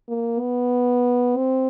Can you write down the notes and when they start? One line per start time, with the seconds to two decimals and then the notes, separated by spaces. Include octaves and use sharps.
0.09 A#3
0.41 B3
1.37 C4